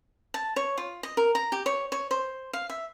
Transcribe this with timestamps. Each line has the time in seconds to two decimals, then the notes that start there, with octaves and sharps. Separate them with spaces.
0.34 A5
0.56 C#5
0.78 F4
1.03 D#5
1.17 A#4
1.35 A#5
1.52 G4
1.66 C#5
1.92 C#5
2.11 C5
2.53 F5
2.70 E5